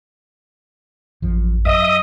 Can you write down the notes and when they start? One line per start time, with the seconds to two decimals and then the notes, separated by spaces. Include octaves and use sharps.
1.22 A1 F#2 F3
1.65 F#2 D#5 E5 D#6